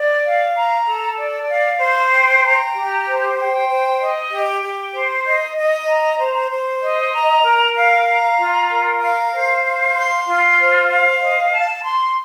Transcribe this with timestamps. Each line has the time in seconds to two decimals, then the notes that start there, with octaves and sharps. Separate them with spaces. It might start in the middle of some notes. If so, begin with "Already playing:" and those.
Already playing: D5
0.23 F5
0.55 A#5
0.87 A4
1.17 D5
1.49 F5
1.80 C5
2.11 G5
2.43 A#5
2.74 G4
3.06 C5
3.37 G5
3.68 C5
3.99 D#5
4.31 G4
4.63 G4
4.94 C5
5.25 D#5
5.57 D#5
5.88 A#5
6.19 C5
6.50 C5
6.82 D#5
7.13 A#5
7.45 A#4
7.76 F5
8.08 A#5
8.39 F4
8.70 A#4
9.01 F5
9.33 C5
9.64 F5
9.96 C6
10.27 F4
10.59 C5
10.90 F5
11.21 D#5
11.52 A5
11.84 C6